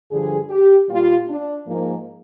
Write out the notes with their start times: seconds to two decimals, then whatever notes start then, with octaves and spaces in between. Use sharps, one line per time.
0.11 G2 D3 F3 G#4
0.50 G4
0.89 A#2 G3 F4
1.28 D4
1.67 G#2 F3 A#3